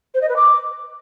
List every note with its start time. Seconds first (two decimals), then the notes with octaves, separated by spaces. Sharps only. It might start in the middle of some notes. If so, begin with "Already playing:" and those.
0.14 C5
0.21 D#5
0.29 B4
0.36 D6